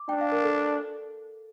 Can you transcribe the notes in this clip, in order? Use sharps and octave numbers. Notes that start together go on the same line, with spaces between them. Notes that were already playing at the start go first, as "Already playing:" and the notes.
Already playing: D6
D4 G5
F5
A#4
A4